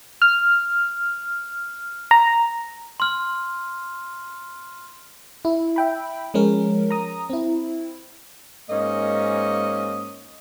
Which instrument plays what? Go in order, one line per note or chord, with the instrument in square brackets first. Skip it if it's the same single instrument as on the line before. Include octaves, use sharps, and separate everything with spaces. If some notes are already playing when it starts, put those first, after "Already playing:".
[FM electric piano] F6
A#5
[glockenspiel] C6 F6
[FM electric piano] E4
E5 G5 B5
F3 G#3 C#4 A#4
A#5 D#6
C4 E4
[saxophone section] G#2 A#3 C#4 D#5